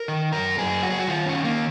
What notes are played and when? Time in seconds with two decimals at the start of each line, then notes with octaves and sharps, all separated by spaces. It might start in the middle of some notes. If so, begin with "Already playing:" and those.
Already playing: A#4
0.08 D#3
0.33 F#2 A#4
0.58 F#2 G#4
0.82 F#3 F#4
0.90 G#4
0.99 F#4
1.08 D#3 F4
1.26 C#4
1.32 D#3
1.45 A#3